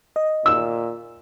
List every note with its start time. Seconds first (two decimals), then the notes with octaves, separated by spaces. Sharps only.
0.16 D#5
0.46 A#2 E6